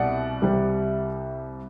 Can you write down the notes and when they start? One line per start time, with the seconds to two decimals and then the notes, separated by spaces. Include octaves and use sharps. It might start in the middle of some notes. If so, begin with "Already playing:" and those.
Already playing: C2 B2 D5 F#5
0.42 C2 C3 G3